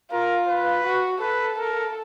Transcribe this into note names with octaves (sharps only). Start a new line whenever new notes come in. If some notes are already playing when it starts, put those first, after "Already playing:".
F4 A#4
B4
F#4
A4 B4
A#4